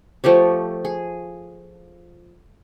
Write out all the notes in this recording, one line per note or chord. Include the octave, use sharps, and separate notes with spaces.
F3 A3 G4 C#5
G#4